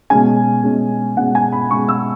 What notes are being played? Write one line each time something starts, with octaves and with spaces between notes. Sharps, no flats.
B2 G#3 C#4 G#5
B2 G#3 C#4
B2 G#3 C#4 F#5
G#5
B5
B2 G#3 C#4 C#6
E6